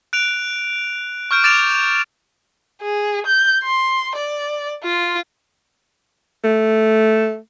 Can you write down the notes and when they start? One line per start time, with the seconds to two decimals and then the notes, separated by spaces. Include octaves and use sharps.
0.13 F#6 D7 F7
1.31 C#6 F6 G6 D7
1.44 D6 A6 D7 E7 F7
2.82 G#4
3.27 G6
3.63 C6
4.16 D5
4.83 F4
6.44 A3